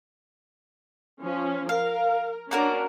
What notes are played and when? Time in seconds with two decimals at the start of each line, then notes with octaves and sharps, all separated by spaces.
1.21 F3 C#4
1.69 A#4 F5
2.51 A#3 C#4 D4 F#4 A#4